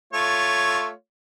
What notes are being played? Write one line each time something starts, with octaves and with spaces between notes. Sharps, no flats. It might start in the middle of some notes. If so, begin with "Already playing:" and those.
A3 F4 C#5